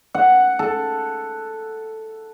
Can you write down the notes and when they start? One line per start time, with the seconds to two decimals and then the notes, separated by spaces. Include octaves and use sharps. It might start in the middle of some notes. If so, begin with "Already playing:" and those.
0.15 F#5
0.59 A4